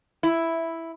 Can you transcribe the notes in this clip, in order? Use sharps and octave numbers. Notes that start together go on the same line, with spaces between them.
E4